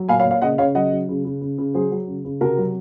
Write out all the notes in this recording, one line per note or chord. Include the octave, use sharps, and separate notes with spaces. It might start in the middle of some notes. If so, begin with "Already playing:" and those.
Already playing: F#3
A#2 F5 G#5
C#5 F5
A#2
C#5 F5
C#3 D#5 F#5
C#3 C#5 F5
F#3 D#5 F#5
F#3
C#3
C#3
C#3
C#3
F#3 G#4 C5
F#3
C#3
C#3
C3 F#4 A#4
F#3